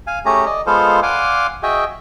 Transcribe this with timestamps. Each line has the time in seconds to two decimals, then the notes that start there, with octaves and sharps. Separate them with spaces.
0.07 F5 G#5
0.25 A3 C#4 G4 G#4 A#5
0.46 D5 D#5
0.67 G#3 B3 F4 A4 C5 F5
1.03 D5 F5 F#5 G#5 C6 D6
1.63 F#4 G#4 D#5 E5 G5